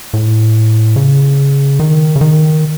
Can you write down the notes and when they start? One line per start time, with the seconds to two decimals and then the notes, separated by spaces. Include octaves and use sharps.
0.14 A2
0.96 C#3
1.80 D#3
2.16 C#3
2.21 D#3